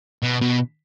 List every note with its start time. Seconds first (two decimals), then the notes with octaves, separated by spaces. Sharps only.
0.23 B2
0.41 B2